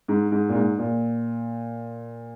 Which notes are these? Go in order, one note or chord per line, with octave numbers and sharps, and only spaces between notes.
G#2
G#2
A#2
G#2
A#2